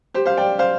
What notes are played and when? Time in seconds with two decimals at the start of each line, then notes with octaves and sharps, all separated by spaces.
0.14 G4 C5
0.26 C5 F5
0.37 D5 G5
0.59 C5 F5